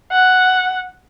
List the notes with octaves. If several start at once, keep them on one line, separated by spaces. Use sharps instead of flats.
F#5